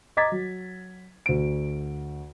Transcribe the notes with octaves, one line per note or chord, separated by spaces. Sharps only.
D#5 A#5 D6 G#6 A6 B6
F#3
D2 D7